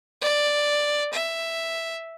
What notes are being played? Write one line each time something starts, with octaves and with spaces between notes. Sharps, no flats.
D5
E5